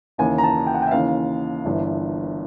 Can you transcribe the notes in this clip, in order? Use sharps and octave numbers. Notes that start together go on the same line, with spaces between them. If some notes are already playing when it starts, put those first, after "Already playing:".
D#2 C#3 E3 G#5
A#5
A5
G5
F#5
G5
E5
D#2 C#3 E3 F5
G1 G2 E3